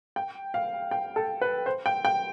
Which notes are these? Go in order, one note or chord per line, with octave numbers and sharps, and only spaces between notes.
G5
F5
G5
A4
B4
C5
G5
G5